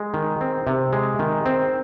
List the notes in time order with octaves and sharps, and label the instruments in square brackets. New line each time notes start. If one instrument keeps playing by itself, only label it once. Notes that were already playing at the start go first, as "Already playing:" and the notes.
Already playing: [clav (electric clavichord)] G#3
D#3
C4
C3
G#3
D#3
C4